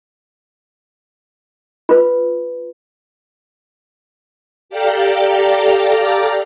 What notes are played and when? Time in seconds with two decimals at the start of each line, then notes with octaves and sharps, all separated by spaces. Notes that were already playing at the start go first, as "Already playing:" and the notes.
1.89 F4 B4
4.69 G4 A4 D5 F5 G5 A#5